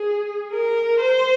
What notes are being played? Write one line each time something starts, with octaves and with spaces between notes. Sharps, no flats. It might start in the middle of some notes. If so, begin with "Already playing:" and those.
Already playing: G#4
A#4
C5